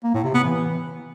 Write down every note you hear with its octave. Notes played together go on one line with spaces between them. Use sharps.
A#3
A2
C3
B3
E3